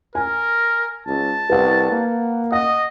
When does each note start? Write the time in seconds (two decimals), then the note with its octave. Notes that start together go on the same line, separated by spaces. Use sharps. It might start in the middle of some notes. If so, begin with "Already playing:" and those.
0.15 A#4 G#5
1.06 C#2 A5
1.49 C2 B4 F#5
1.91 A#3
2.52 D#5 F#5